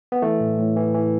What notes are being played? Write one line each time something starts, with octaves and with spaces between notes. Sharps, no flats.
B3
E3 A3
A2
A2
E3
E3